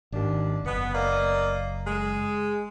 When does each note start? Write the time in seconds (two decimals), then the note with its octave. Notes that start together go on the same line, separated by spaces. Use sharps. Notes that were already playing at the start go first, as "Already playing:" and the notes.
0.12 G#1 D#2 D4
0.65 F#1 B3
0.93 A#3 D5 D#5
1.85 G#3